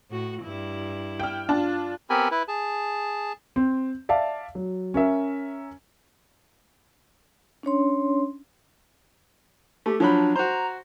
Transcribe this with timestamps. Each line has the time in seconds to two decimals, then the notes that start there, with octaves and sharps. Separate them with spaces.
0.10 A2 F#4
0.43 G2 E4
1.20 G5 F6
1.49 D4 F4 A5
2.10 B3 C4 G4 A#4 G#5 B5
2.31 E4 B4
2.48 G#4 A5
3.56 C4
4.09 D5 E5 F5 A5
4.55 F#3
4.94 C#4 A#4 E5
7.63 C#4 D4 C#5 C6
9.86 A3 G4
10.00 F3 F#3 D4 B5
10.36 F#4 C5 A#5